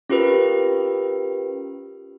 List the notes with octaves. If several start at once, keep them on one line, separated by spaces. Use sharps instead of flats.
C#4 F4 G4 A#4 B4